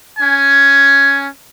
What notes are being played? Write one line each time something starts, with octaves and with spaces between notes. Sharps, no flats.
C#4 G#5